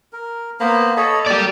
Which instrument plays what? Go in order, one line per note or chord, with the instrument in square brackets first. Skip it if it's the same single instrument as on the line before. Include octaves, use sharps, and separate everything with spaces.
[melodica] A#4
[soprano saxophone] A#3 [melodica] B3 C5 B5
[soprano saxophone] A4 [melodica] C#5 D#5 B5
[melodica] A#3 [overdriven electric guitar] G4 D5